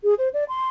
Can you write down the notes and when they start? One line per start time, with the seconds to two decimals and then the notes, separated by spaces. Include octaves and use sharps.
0.03 G#4
0.18 C5
0.33 D5
0.48 C6